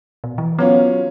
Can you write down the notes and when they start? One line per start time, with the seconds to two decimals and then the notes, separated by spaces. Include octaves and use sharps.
0.24 B2
0.38 E3
0.59 F#3 B3 C#4 F4